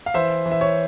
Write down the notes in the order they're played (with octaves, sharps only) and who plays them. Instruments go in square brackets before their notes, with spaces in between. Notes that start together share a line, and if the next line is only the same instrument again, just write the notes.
[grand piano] F5
E3 C5 E5
E3
E5
C#5